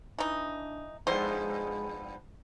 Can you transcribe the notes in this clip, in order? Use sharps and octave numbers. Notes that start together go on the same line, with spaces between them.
E3 D4 D#4
G2 F3 G#3 B3 C5